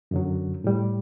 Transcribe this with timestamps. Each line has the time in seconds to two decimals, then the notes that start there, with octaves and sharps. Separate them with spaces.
0.11 F#2 D3 F#3
0.64 A2 G3